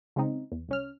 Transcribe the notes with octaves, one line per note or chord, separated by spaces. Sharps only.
C#3 G#3 C4 D#4
E2
C2 C#4 F6